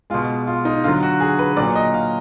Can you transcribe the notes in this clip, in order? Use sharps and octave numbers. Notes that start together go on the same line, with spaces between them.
B2 G#3 F4
F4
D#4
D3 F#3 F4
F#4
G#4
B4
A#2 F#3 D5
D#5
F5